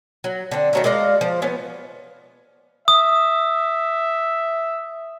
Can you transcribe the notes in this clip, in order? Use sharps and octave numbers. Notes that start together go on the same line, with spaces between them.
F#3
D3 C4
D#3 F#3 A3
G#3 D5 D#5 F5
F3
B3 C#4
E5 D#6